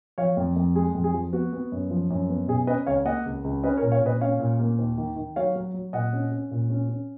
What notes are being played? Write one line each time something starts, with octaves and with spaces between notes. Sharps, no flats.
F3 C#5 F5
F2
F2
G#3 G#4
F2
G#4
F3
B3 F#4
B3
F#2
F3
F#2
B3
B2 G#4
C#4 B4 D#5
C#2 C#5 F5
A#3 D#5 F#5
C#2
C#2
C#4 B4 D#5
A#4 C#5
A#2
C#5 F5
A#2 B4 D#5
C#4 C#5 F5
A#2
A#3
D#2
D#3
D#3
F#3 C#5 F5
F#3
F#3
A#2 D#5 F#5
C#4
C#4
A#2
C#4
C#4